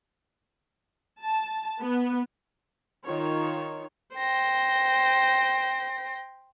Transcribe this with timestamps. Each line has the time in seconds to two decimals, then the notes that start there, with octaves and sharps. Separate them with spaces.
1.22 A5
1.81 B3
3.04 D#3 F4 C#5
4.17 C5 G5 A#6